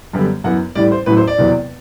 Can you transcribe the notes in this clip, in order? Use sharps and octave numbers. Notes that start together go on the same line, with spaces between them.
F#2 D3 G3 B3
F#2 E3 B3 F#5
A1 A2 G3 D5
C5
A1 A2 F#3 B4
C5
D5
E1 E2 C3 F#3 B3